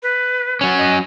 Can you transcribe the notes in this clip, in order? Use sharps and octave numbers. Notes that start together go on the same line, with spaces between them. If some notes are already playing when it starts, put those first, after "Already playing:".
B4
F#3 C#4
D#5